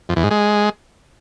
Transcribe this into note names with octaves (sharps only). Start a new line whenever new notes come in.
F2
E2
G#2
G#3